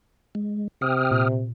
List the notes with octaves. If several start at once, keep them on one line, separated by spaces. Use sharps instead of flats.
G#3
C3 G5 D#6 F6
A#2